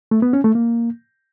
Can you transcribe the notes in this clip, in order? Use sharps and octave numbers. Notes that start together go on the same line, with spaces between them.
A3
B3
C#4
A3
A#3